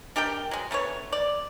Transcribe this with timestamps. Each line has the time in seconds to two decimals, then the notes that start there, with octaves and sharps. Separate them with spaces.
0.16 D4 G4 A#4 G5
0.51 F#3 G#3
0.71 D3 A3 B3 C#5
1.12 D5